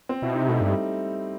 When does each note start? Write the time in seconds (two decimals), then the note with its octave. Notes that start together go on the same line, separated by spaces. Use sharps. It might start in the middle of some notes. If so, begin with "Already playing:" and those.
0.09 C4
0.22 B2 E4
0.35 C3 D#4
0.48 B2 A3
0.58 G2 G3
0.68 A3